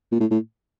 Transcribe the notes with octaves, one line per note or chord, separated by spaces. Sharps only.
A#2
A2
A2